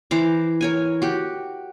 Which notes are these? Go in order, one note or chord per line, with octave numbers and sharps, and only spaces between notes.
E3 C5 A#5 D6
A#4 C#5 G#5
F#4 G4